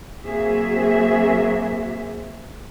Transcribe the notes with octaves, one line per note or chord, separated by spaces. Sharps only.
F#3 A#3 C4 F#4 G#4 E5